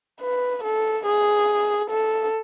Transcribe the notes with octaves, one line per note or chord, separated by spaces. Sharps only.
B4
A4
G#4
A4